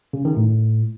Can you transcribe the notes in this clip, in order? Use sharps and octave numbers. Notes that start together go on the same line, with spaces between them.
C#3
D#3
A2